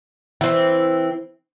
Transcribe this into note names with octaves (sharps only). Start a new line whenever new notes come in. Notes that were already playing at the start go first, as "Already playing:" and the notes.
E3 C4